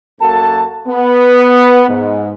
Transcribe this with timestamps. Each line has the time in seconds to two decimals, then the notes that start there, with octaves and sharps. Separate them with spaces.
0.21 F#2 A#3 F#4 A4 A5
0.87 B3
1.89 G#2